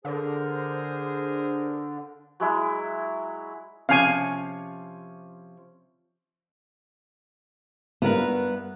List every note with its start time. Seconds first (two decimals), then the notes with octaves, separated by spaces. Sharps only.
0.05 D3 G#4 A#4 C5
2.40 F#3 G#3 E4
3.89 C3 F3 C#4 F5 G#5
8.02 G2 B3 E4 F4 A#4 B4